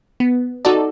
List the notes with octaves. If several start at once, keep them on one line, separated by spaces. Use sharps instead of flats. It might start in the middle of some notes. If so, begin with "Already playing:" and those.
B3
D#4 F#4 A4 D5